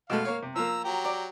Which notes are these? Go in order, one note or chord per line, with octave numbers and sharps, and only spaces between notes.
B2 G#3 A3 F5
A#3 C#5
C3
F3 A#3 A#5 E6
F#3 G4 A#5
D5